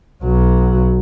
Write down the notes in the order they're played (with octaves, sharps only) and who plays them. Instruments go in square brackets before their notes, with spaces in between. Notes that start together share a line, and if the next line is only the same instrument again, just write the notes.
[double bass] B1 F#3